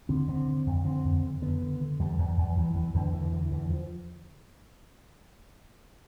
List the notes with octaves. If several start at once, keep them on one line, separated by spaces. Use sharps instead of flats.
D3 C4
D3 C4
D3
F2
D3 C4
F2
D3
D3 B3
D3
D3
E2 G3
E2
E2
E2 E3
E2 E3
E2 D3
D3 E3
D3 E3
E2 E3
F3